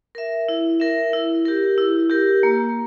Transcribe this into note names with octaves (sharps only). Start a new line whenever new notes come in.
A#4 E5
E4
A#4 E5
E4
G4 A#4
E4
G4 A#4
A#3